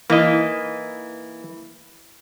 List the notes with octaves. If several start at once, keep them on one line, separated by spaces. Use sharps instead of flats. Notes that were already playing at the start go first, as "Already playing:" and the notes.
E3 A#3 D#4 D#5